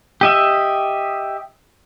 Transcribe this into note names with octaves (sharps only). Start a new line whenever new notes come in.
G4 D#5 E5